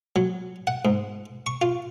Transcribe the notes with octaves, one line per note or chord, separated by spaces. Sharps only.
F#3
F#5
G#2
C#6
F4